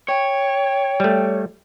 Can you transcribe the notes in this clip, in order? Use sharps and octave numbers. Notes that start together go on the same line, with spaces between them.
C#5 G5
G3 A3